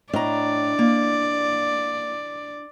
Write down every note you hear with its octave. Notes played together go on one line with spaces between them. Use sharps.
A2 D4 E4 D5 D#5 A#5
A#3